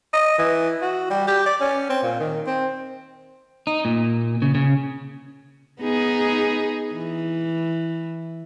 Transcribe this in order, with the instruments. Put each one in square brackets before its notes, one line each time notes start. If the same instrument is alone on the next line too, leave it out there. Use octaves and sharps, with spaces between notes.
[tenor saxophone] D#5
E3
F#4
G3
G4
D5
C#4
C4
A#2
D#3
C4
[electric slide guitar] D#4
A#2
C#3
C#3
[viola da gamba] B3 D#4 G#4
E3